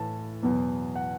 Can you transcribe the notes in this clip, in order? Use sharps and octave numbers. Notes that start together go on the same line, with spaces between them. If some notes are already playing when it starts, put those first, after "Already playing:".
Already playing: A2 E3 A5
E2 B2 F#3
F#5